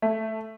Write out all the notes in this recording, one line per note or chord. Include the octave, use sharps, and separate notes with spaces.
A3